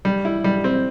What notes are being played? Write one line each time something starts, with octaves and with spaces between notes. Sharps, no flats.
G3
E4
G3
C4